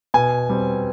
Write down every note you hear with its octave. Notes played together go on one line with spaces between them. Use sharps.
B2 G#5
G3 C4